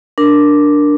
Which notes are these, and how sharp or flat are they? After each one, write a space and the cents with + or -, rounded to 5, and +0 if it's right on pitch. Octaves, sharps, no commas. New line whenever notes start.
D4 +0 A#4 +0